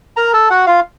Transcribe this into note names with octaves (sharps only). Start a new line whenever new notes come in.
A#4 A#5
A4 A5
F#4 F#5
F4 F5